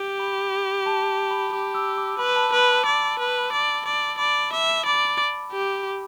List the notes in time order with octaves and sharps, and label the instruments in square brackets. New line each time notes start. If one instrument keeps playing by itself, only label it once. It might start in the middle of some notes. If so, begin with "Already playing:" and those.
Already playing: [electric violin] G4
[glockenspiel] B5
A5
B5
[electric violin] G4 [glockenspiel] D6
[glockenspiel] E6
D6
[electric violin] B4 [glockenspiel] B5
[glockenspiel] A5
[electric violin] B4 [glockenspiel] B5
[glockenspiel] A5
[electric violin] D5
B4
D5
D5
[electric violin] D5 [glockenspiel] B5
[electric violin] E5 [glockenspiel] D6
[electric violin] D5 [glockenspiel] B5
[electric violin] G4